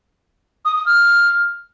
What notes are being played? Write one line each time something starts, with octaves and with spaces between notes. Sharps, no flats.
D#6
D#6
F6